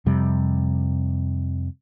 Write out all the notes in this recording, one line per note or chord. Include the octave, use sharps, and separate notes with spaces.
F2 C3 G3